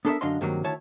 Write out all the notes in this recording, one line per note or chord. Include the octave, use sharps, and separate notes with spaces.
B3 D4 A4 A#4 C#5 E5
F#2 D3 D4 D#5 F5 C6
G2 C3 D#3 F#3 A#3
D2 D#3 E4 C#5 A5